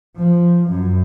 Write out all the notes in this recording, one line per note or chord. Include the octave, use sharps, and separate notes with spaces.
F3
F#2